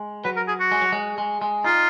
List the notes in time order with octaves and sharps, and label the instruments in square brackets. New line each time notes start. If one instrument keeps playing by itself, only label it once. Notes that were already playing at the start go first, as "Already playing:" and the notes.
Already playing: [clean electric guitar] G#3
[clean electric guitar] F#3 [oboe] B4
[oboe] A#4
G#4
F#4
[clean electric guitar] G#3
F#3
G#3
G#3
G#3
[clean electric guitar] D#4 [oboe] F4